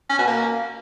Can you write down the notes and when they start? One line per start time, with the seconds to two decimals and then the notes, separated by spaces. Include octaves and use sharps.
0.10 C#4
0.19 B2
0.27 A#3